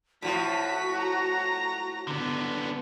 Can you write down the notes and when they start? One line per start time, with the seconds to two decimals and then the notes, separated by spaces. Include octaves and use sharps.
0.22 A2 F3 F#4 B6
0.99 A#5 A#6
2.08 D3 B3